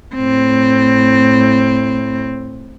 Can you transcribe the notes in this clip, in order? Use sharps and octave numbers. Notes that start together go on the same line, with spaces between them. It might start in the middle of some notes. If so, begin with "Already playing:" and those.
A2 C4